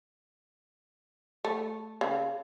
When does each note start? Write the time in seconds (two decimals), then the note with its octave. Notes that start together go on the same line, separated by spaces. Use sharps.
1.45 A3
2.01 C#3